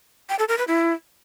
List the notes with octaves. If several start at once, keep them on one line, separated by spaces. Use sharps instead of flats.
G5
A4
A#4
B4
E4